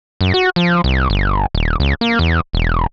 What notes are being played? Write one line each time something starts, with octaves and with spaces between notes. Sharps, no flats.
F#2
F#4
F3
C2
G1
D#1
C#2
A#3
E2
E1